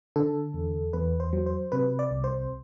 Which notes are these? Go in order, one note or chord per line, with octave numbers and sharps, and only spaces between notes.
D3 A4
E2
E2 B4
C5
F#3
C5
C3 B4
D5
C2
C5